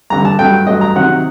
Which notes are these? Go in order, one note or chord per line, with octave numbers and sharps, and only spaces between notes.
G2 D3 G3 A#5
A5
G2 F#3 A3 G5
G2 F#3 A3 D#5
A#5
C3 D#3 F#3 F#5